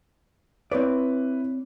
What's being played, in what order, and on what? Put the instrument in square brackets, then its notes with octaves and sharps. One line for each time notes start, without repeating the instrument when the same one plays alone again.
[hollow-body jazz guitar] C4 C#5 D5 [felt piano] E4 B4